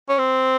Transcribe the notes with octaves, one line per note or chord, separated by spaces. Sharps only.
C#4
C4